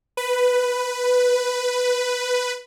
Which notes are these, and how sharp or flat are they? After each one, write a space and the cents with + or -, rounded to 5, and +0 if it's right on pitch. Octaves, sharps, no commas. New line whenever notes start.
B4 +5